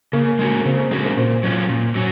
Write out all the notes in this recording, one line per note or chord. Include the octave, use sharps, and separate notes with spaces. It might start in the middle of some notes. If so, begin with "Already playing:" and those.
C#3 A#3
G#3 C#4 F#4
A#3
C#3 C4
A#4
G#3 C#4 F#4 C5
A#4
A#2 C5
F#3 C#4 F4
A#2
F#3 C#4